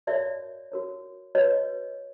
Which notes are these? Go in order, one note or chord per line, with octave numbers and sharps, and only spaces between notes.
F#4 A#4 C#5 D5 E5
F#4 A#4 C#5
F#4 B4 C#5 D#5